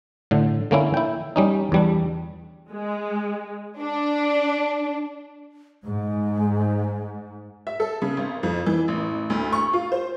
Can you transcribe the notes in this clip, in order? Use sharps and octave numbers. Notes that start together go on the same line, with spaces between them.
A2 D3
D3 A#3 C#4 E4
E4 G5
G3 C#4 D#4
E2 G3 D4
G#3
D4
G#2 G#3
E5
A4
C#3
G#1
F2
E3
A1
D2
C#6
F4
C5